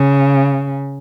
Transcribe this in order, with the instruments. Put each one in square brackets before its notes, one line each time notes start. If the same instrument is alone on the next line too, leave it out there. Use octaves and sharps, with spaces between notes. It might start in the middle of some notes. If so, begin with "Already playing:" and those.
Already playing: [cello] C#3